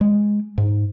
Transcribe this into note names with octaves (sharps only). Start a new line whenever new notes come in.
G#3
G#2